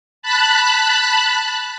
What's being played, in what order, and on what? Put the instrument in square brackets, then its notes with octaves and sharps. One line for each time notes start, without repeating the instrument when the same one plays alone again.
[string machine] A5 B5 F#6